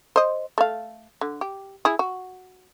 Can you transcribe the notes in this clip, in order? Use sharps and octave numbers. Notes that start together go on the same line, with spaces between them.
C5 D#5
A3 F5
D3
G4
E4 G#4
F#4